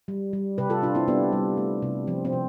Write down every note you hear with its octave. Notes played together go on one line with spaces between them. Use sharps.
G3
G3
C3 G4 B4
F4 A4
C3 D4 F4
C4 E4
G3 B3 D4
G3
A3
C3
F3 C4
C4
C3